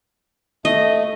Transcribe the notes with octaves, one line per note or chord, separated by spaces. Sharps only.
A3 D#5